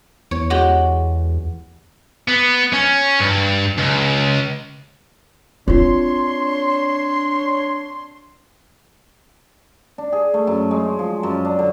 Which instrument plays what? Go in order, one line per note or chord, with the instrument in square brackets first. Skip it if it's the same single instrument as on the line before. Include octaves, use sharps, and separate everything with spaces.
[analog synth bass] E2 [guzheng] C#5
[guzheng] G#3 F#4 G4
[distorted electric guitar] B3
C#4
G2
C#2
[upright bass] C4 F4 [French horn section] D4 [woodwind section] C#5 C6
[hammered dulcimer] D4
G#4
A3
F#2
G#3
F3
F#2
D4
D3